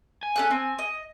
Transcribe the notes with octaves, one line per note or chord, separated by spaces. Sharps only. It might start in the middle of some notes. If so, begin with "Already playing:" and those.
G#5
C#4 A4 F#6
C4
D#5